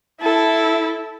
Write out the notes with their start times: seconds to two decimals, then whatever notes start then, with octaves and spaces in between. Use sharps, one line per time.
0.21 E4 A4